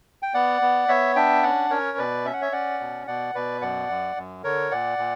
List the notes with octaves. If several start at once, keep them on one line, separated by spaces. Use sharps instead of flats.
G5
B3 D5 F#5
B3
B3 C#5 E5
D4 E5 G5
C#4 D5 F#5
C#4 A#4 C#5
B2 B4 D5
C#4 E5
F#5
C#5 E5
C#4 D5 F#5
B2
B2 D5 F#5
B2 B4 D5
F#2 D5 F#5
F#2
F#2
D3 A#4 C#5
A#2 D5 F#5
A#2